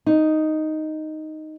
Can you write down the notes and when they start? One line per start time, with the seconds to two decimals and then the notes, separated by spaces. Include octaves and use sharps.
0.06 D#4